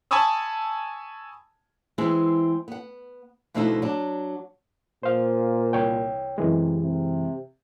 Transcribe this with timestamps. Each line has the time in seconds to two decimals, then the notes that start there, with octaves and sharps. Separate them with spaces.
0.11 G#5 A5 B5 C#6 D#6 E6
1.98 E3 G#3 C4 E4 G#4
2.68 B3 F#5
3.54 D2 B2 F3 A3 D#4 E4
3.82 F#3 D4
5.03 A#2 C5 F5
5.73 C2 C#5 G5
6.38 F#2 C3 E3 G#3
6.82 C3